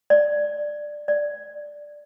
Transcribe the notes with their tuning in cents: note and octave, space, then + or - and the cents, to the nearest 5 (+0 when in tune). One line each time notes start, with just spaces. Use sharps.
D5 +10
D5 +5